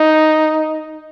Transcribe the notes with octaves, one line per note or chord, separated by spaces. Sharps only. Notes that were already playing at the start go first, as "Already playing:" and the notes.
Already playing: D#4